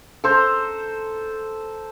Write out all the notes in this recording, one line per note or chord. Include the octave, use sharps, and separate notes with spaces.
A4 C5 A#5